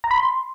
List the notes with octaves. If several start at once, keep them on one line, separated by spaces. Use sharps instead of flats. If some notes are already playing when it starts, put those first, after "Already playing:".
A#5
B5
C6